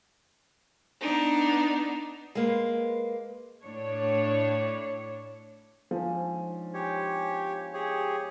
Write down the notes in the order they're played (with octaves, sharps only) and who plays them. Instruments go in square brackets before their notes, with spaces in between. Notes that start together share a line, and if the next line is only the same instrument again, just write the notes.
[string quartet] B3 D4 D#4
[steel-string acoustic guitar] G#3 A#3 B4
[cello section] A2 D4 C#5
[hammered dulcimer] G#2 C#4 D4 [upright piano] F3
[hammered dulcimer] G#3 B3 G#4 [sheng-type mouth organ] G4 C#5
[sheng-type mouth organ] G4 G#4 C#5 [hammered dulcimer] D#5